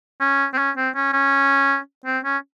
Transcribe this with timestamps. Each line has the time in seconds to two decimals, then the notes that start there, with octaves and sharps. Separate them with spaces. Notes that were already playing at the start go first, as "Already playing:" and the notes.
0.21 C#4
0.54 C4
0.58 C#4
0.77 C4
0.95 C#4
1.13 C#4
2.06 C4
2.25 C#4